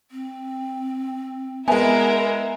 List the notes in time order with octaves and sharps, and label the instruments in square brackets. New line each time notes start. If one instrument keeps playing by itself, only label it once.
[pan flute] C4
[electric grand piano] G#3 B3 [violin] E4 A#4 [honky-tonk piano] B4 E5 G#5